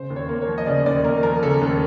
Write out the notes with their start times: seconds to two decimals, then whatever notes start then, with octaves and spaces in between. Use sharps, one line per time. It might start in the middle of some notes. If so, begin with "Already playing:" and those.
Already playing: C#3 C5
0.10 D#2
0.16 C#5
0.29 A#3
0.41 C#5
0.48 F3
0.58 D#5
0.66 C#3 D5
0.86 D#2 D5
1.04 A#3 A#4
1.23 F3 A#4
1.43 C#3 A4
1.61 D#2